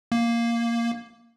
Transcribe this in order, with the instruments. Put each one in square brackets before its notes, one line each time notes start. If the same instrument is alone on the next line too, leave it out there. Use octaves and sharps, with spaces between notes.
[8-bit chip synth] A#3